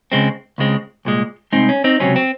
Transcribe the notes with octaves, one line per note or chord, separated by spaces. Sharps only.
C#2 C#3 G#3 C4
C#2 C#3 G#3 C4
C2 A#2 G#3
C2 A#2 G#3 C4 D#4
C#4
C4 D#4
C#2 C3 F#3 C4 C#4
C4